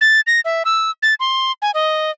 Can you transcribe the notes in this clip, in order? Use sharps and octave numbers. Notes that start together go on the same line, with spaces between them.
A6
A#6
E5
E6
A6
C6
G#5
D#5